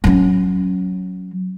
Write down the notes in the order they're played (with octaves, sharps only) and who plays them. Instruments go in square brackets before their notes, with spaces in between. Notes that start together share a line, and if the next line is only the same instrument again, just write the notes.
[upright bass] F#3 C#4